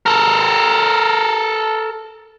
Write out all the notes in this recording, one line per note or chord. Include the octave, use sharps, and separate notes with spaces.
A4 A#4